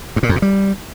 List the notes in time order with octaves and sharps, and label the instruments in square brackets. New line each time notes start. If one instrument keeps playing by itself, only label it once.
[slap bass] G2
A#2
F2
A#2
G3